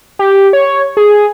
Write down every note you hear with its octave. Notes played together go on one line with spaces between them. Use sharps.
G4
C#5
G#4